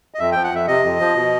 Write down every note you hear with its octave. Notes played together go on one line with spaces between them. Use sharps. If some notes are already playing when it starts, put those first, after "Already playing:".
D#5
F2 E5
F3 G5
F#5
F2 E5
C3 D#5
F2
F3
B2